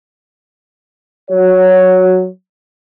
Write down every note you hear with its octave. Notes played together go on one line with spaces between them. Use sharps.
F#3 F#4 C#5